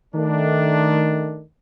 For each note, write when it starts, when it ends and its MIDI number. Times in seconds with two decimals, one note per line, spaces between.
0.14 1.42 51
0.14 1.42 57
0.14 1.42 62